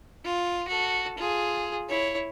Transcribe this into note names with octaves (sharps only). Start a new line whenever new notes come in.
F4
F#4 A4
F4 G#4
E4 C#5